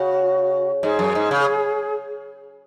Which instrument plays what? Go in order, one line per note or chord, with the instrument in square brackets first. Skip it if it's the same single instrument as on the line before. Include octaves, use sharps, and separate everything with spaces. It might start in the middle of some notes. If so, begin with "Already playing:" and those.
Already playing: [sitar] C#3 [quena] F#4
[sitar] G#2 [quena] G#4
[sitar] F#2
G#2
C#3